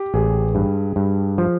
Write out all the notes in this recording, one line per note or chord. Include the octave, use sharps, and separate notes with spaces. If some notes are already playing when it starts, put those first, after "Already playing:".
Already playing: G4
A1 G#4
G2
G2
F3